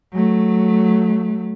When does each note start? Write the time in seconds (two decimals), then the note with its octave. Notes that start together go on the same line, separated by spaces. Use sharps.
0.13 F#3 A3